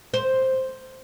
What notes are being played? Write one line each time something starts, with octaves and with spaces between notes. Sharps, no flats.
C5